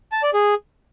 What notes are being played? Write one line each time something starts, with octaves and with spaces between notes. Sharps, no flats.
A5
D5
G#4